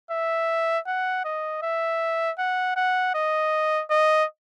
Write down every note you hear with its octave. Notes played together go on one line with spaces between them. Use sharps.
E5
F#5
D#5
E5
F#5
F#5
D#5
D#5